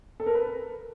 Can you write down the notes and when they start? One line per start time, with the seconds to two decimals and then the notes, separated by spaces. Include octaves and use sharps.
0.20 A4
0.26 A#4
0.35 B4